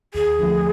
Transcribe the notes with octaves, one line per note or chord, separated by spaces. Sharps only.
D#2 G#4
D3 F3 A3